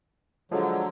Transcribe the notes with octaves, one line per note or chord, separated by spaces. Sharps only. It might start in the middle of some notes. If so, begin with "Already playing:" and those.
D3 F3 F#3 G#3 A4